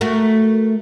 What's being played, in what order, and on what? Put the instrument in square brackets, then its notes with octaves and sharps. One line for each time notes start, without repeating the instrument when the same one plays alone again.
[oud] A3 F#4 A#4